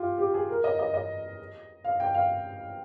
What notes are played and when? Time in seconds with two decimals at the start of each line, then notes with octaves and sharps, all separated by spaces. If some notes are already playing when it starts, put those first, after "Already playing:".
Already playing: F4 G4
0.18 G4
0.34 G#4
0.49 A#4
0.64 D#5
0.79 D#5
0.94 D#5
1.84 F5
2.00 G5
2.14 F5